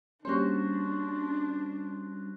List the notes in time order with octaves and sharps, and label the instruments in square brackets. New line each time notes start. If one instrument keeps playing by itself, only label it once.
[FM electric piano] G3 C#4 [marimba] A#3 G4 [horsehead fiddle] D4 [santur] F#4 C5